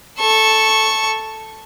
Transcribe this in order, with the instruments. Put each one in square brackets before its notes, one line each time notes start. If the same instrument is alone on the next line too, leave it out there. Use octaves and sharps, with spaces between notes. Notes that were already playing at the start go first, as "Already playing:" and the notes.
[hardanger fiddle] A4 C#6